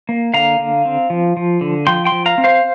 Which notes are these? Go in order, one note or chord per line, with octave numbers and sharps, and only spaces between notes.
A#3
D3 F5 A#5
D3
C4
F3
F3
D3
F3 G5 C6
G5 C6
F3
F5 A#5
C4
C5 F5